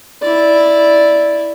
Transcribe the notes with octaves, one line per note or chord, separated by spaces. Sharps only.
E4 D5